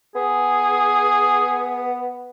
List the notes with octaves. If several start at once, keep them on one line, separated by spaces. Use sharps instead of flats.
B3 G#4